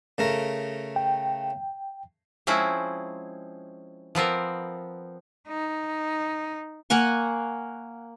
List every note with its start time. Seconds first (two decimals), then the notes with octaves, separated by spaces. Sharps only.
0.18 C#3 A3 A#4
0.96 G5
2.47 F3 G#3 C4 C#4 E4
4.15 F3 B3 C4 A#4
5.48 D#4
6.90 A#3 F#5 G#5 C#6